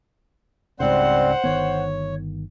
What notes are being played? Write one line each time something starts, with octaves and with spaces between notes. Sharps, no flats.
C#2 G#2 C#3 G3 C4 C5 F#5
G1 D#3 B3 C#5